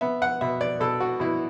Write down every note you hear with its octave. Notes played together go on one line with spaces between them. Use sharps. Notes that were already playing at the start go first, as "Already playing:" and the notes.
B3 E5
F#5
B2 E5
D5
B2 A4
F#4
B2 E4